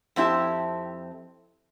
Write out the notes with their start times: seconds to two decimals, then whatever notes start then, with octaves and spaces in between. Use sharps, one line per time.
0.16 F2 C4 E4 G4 A5